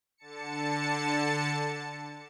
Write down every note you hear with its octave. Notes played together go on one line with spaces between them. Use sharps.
D3 A5 C#7